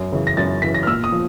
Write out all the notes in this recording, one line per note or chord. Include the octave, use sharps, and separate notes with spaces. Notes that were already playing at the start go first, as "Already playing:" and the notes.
Already playing: F#2
C#3 E3
A#6
F#2 A6
C#3 E3 B6
A#6
F6
A#2 E6
D#6
F3